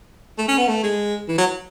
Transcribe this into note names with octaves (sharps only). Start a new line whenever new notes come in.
A3
C#4
B3
A3
G#3
E3
F#3